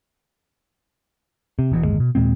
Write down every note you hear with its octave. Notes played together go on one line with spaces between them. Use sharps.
C3
E1 E2 B2
D1 G1 D#2 G#3
B2
D#2 A#2 G#3 C4